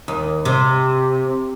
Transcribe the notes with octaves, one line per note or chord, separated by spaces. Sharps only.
D#2
C3